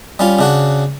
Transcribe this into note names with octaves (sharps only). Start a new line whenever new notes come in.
G3 C#4 F4
C#3 D4 F#4